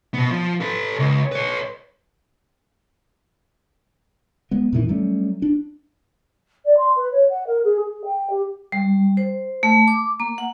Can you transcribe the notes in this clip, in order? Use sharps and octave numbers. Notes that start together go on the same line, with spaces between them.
B2 B3
F3
A4 B4
C#2
B4 C#5
G#3 B3
F2 A#2 D#3 E3
F#3 G3 A3 C#4
D4
D5
C6
B4
C#5
F#5
A#4
G#4
G#4
G5
G4
G3
C5
A3
D6
A#3
F#5